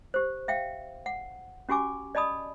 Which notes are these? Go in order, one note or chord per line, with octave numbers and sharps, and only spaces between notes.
G4 C5
E5 F5 G5
F#5
C#4 F#4 G4 G#5 D6
D5 D#5 A5 B5 D#6